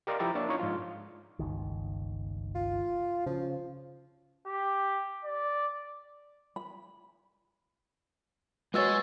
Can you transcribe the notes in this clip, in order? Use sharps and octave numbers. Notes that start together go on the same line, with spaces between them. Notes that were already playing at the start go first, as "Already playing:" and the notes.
G4 A#4 D5 D#5 F5 C6
F3 E4 G4 A#5 A6
A#3 D4 C#5 E5 A5
C#4 D#4 F4 C#5 D#5
G#2 F3 F4
G1 C#2 D#3
F4
C#3 F3
G4
D5
B5
G#3 F#4 B4 C#5 D#5 G#5 E6 A6